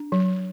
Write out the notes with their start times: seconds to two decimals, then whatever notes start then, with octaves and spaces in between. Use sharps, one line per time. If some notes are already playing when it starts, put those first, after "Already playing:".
Already playing: D4
0.12 F#3